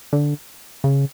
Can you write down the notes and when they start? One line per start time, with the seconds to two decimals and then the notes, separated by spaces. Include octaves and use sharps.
0.13 D3
0.84 C#3